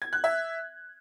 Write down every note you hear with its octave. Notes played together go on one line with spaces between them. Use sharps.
G#6
F#6
E5